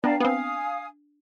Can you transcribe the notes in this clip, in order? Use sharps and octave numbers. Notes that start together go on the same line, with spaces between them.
B3 D4 D5 F5 G5 A5 A#5
B3 C4 F5 G#5 D#6